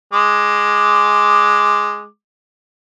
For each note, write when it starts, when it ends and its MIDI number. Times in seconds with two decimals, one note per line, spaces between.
0.14 2.06 56
0.14 2.06 86